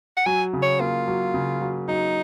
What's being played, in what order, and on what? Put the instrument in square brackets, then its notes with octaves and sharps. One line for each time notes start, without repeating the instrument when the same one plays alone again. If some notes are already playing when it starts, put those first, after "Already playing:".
[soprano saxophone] F#5
[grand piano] F#3 [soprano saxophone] G#5
[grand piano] C#3
[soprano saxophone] C#5
[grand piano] A#3 [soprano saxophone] F4
[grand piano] F#3
C#3
F#3
[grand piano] F#3 [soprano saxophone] D#4